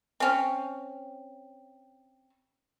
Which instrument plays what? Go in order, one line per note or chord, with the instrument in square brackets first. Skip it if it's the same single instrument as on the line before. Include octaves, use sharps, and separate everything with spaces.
[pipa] C4 C#4